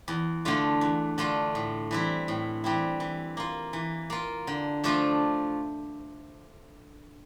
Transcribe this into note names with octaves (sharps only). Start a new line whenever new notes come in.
E2
D3 A3 D4 F4
E2
D3 A3 D4 F4
A2
E3 G3 C4 E4
A2
E3 G3 C4 E4
E3
A#3 F4
E3
A#3 F4
D3
F3 A3 D4 F4